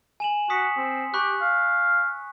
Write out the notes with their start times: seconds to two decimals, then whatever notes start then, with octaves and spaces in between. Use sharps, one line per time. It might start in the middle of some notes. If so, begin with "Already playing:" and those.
0.20 G#5 E7 F#7
0.50 F#4 D#6 B6 C#7
0.77 C4
1.14 G4 B5 C#6 F#6
1.41 F5